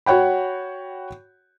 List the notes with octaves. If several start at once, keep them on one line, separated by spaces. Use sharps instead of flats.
F#4 C#5 F#5 G5 B5